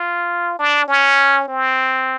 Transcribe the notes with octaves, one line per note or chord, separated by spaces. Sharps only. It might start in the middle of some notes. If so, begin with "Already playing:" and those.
Already playing: F4
D4
C#4
C4